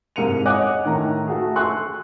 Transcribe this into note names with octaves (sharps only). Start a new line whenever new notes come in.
C2 G#2 A#3 C#7 D#7 F7
C#5 D#5 F#5 G#5 D6 F#6
A2 D#3 A#5
A3 F#4 G#4
G#5 C6 C#6 E6 F#6